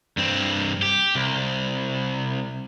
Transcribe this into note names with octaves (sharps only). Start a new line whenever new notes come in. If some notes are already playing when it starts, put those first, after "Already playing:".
G2 C4
G4
C2